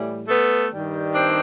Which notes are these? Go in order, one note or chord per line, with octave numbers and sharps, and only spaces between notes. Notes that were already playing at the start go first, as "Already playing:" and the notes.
Already playing: A2 E3 G3
A3 B3
G2 D#3 G3
C4 D4